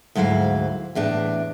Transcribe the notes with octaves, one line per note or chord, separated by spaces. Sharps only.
D2 G#2 F#3 E4 F5
E2 A2 D4